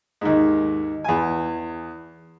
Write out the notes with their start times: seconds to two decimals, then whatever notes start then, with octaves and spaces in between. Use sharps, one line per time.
0.21 D#2 G#2
1.04 E2 G#5